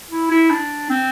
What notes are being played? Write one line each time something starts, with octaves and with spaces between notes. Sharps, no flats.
E4
E4
D4
C4